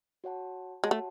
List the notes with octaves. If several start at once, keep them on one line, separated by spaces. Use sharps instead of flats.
F#4 C#5 F#5 A5
G#3 F#4 C#5 F#5 A5
A3